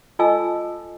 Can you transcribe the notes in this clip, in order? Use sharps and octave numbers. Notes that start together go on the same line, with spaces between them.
F4 A4 D#5 G#5 A5 E6